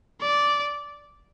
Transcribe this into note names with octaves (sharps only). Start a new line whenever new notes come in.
D5